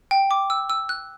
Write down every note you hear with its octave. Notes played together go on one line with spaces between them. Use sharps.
G5
D6
E6
E6
F#6